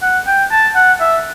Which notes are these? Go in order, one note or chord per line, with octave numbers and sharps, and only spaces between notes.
F#5
G5
A5
F#5
E5